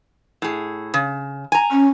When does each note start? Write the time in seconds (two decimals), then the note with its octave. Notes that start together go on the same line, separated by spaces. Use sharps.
0.42 A2 G#4
0.94 C#3
1.52 G#5 A#5
1.71 C#4